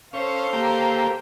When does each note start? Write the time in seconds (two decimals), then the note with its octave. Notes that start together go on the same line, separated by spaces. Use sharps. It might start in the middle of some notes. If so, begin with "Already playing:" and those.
0.13 C#4 A4 C5 F5
0.53 A#3 G4